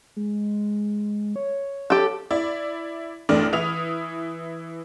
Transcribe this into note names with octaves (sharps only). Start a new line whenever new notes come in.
G#3
C#5
G4 A4
E4 D5
A1 A3 D4 D5 F6
E3 E4 D#6 F7